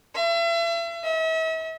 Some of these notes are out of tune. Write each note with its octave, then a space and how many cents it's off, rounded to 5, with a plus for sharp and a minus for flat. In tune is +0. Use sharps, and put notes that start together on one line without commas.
E5 +40
E5 -40